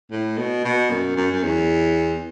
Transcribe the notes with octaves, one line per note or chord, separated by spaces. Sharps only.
A2
B2
B2
F#2
F#2
F#2
E2